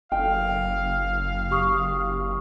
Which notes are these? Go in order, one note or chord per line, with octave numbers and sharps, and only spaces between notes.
F#1 F5 G5
G4 C#6 D#6